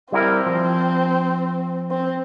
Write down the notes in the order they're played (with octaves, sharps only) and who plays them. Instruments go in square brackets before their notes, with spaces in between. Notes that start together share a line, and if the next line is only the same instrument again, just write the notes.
[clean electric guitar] G3 E4 A#4 [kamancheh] C4
[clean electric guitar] F3
[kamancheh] C4